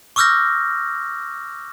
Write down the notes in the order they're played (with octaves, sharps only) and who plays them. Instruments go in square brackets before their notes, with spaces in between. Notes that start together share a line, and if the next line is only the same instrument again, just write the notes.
[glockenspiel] C#6 D6 E6 F6 G6 A#6